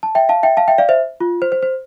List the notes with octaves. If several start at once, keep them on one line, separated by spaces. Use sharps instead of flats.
A5
E5 G5
F5 A5
E5 G5
F5 A5
E5 G5
D5 F5
C5 E5
F4
C5
C5
C5